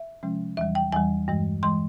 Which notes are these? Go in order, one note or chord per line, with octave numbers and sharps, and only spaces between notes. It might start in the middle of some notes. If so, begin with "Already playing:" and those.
Already playing: E5
C3 F3 G#3 C#4
E2 E3 G3 E5
G5
E2 E3 G3 G#5
G2 E3 G#3
E3 G#3 C6